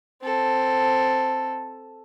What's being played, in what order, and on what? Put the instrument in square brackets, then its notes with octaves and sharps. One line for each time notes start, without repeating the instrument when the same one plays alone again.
[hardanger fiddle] C4 A4